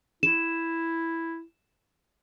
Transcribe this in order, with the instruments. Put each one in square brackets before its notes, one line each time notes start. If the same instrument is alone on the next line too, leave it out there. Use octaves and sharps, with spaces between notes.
[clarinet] E4 [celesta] E7